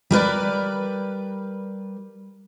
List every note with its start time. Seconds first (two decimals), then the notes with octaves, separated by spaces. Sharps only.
0.11 G3 A#4 B4 D5